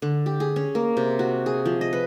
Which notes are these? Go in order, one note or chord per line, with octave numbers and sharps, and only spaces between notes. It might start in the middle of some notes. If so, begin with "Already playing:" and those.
D3
G4
G#4
C#4
A#3
C3
F#4
G#4
F3
D#5
B4